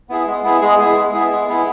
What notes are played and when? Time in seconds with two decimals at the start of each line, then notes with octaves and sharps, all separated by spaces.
0.09 B3 E4 G#4
0.26 G#3
0.44 B3 E4 G#4
0.61 G#3 G#4
0.79 B3 E4 G#4
0.97 G#3
1.14 B3 E4 G#4
1.31 G#3
1.48 B3 E4 G#4